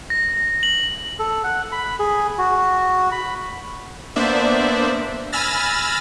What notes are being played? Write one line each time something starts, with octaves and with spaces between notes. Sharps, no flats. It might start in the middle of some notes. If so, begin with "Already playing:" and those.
A#6
F#7
A4
F#5
B5
G#4
F#4
B5
A#3 B3 D4 C5 D5 E5
G#5 B5 E6 F6 A6 A#6